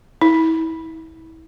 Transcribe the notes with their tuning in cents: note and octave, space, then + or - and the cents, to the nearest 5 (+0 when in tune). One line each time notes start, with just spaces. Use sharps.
E4 -30